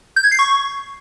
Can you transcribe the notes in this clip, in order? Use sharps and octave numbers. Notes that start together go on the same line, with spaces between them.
G6
G#6
C7
C#6